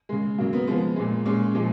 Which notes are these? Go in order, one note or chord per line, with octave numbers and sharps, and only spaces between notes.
C#3 G#3
C#3 F#3 A#3
B3
C#3 F3 G#3 B3
A#2 G#3
A#2 G#3 C#4
A#2 F3 G#3